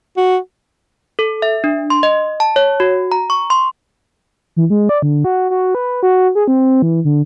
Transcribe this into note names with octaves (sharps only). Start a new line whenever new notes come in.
F#4
A4
E5
D4
C6
D#5
A5
C#5
F#4
A#5
C#6
C6
E3
G#3
D5
D3
F#4
F#4
B4
F#4
G#4
C4
E3
D3